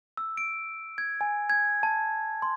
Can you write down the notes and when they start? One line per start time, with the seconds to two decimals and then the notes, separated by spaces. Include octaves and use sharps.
0.17 E6
0.37 D7
0.98 G#6
1.21 G#5
1.50 G#6
1.83 A5
2.42 C6